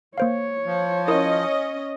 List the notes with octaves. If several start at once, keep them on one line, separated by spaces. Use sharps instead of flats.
A#3 C5 C#5 F5
F3
C#4 E4 A#4 D#5 D#6